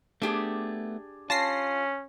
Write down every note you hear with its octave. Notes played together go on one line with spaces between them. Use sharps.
A3 B3 D4 G4 G#4
C#4 F4 A5 A#6 C7